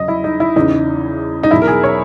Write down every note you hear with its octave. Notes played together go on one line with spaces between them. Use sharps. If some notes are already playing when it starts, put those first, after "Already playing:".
Already playing: E2 C#3 F#3 D#5
E4
D#4
E4
E2 C#3 E3 D#4
D#4
E2 B2 F#3 E4
A#4
G#4
C#5